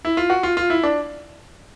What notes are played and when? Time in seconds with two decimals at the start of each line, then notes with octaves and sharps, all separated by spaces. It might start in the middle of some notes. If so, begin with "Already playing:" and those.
0.05 E4
0.17 F4
0.30 F#4
0.43 F4
0.57 F4
0.70 E4
0.83 D4